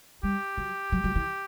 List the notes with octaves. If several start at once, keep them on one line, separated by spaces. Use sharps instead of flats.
G3 G4
F#3
F#3
F#3
E3